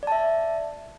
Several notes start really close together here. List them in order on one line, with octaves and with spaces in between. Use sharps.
D5 A5 E5